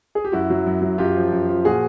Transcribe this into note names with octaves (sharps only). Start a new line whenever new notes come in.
G#4
G4
F#2 E4 F#4
F#3
F#2
F#3
F#2 F4 G4
F3
F#2
F3
A#2 F#4 G#4